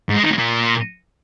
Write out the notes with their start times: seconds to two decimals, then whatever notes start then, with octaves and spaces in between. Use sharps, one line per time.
0.09 G#2
0.16 G#3
0.24 D#3
0.31 A2
0.38 A#2